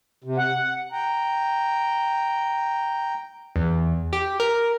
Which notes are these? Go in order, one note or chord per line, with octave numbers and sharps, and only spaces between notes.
C3
F#5
G5 A#5
E2
G4
A#4